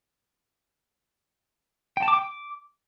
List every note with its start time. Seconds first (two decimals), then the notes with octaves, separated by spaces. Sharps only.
1.97 G5
2.02 A5
2.08 D6
2.13 G5
2.19 D6